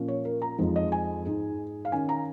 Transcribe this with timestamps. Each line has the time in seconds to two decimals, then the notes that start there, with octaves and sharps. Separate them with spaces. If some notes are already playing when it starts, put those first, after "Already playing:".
Already playing: A#2 F3 A#3 C#4
0.08 C#5
0.25 A#4
0.42 A#5
0.58 F2 F3 G#3 D#4
0.76 D#5
0.92 G#5
1.26 G#2 G#3 D#4
1.85 F5
1.92 D#3 C#4 G#5
2.09 A#5